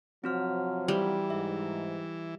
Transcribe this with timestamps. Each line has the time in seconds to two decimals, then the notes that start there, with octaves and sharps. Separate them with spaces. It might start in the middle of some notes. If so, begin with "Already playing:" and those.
0.24 C3 F3 F#3 C4 F#4 F6
0.88 E3 G3
1.30 G#2 E5